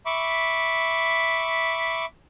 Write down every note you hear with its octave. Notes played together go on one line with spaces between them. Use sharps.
E5 B5 C#6 D6